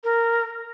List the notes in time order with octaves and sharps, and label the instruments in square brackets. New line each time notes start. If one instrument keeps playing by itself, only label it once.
[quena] A#4